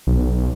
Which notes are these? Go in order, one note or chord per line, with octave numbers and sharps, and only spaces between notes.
B1